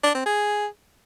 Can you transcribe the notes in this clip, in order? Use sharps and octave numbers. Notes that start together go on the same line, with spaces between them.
D4
C4
G#4